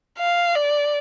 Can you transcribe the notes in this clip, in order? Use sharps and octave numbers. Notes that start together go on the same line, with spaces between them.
F5
D5